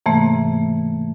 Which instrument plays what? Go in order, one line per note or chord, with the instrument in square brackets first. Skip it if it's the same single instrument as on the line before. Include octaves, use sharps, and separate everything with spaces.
[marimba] G#2 C3 E3 A3 A#3